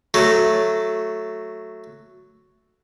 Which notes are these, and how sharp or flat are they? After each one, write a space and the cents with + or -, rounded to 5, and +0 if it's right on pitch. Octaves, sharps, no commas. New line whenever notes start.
F#3 +0 A3 +0